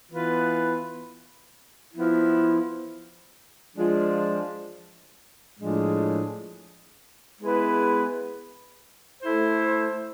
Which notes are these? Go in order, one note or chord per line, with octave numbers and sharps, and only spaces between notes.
E3 B3 F4 B4
F3 B3 E4
F3 G#3 D4 F4
A2 F3 G#3 D4 G#4
G#3 B3 E4 B4
A3 E4 A4 C5